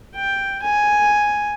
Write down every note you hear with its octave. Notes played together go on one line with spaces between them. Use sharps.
G5
G#5